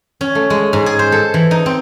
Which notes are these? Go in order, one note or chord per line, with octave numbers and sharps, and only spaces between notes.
C#4
A3
G#3
G#2
G#4
C5
A4
E3
D#4
C4